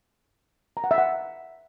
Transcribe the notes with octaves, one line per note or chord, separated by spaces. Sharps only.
A#5
F#5
E5
F#5